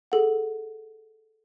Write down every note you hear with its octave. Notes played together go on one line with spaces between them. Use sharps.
G#4 A4 F#5